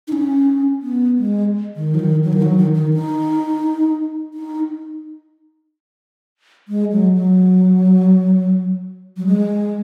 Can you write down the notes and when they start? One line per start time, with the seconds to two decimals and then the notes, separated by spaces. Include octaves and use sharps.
0.08 D#4
0.12 C#4
0.83 B3
1.18 G#3
1.76 D#3
1.95 F#3
1.99 D#3
2.24 F#3
2.33 D#3
2.42 F#3
2.58 D#3
2.74 D#3
2.94 D#4
4.34 D#4
6.68 G#3
6.92 F#3
7.15 F#3
9.17 F#3
9.27 G#3